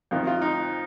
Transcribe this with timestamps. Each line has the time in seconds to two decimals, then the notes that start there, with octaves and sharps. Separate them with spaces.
0.11 F2 D#3 F4
0.27 F4
0.42 D#4